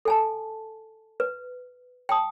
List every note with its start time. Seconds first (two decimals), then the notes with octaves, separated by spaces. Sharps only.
0.05 A4 G#5 A5
1.20 B4
2.09 G5 A5 D#6